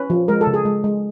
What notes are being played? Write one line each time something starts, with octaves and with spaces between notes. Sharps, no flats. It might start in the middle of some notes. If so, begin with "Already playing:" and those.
Already playing: C#4 B4
F3
G#3 A#4
A4
C#3
G#4
G#3
G#3